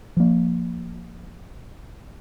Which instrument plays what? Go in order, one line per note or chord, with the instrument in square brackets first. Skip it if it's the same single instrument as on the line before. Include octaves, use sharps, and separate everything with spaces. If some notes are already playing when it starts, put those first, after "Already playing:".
[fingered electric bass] F3 A#3